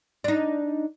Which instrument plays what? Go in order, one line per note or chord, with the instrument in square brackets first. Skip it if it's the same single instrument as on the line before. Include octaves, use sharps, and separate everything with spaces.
[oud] D4 D#4